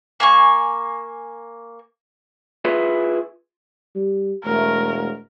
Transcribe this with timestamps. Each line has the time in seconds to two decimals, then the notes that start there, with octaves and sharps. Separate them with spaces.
0.20 A#3 G#5 C#6
2.65 E4 F4 G#4 B4 E5
3.96 G3
4.44 E1 A3 A#4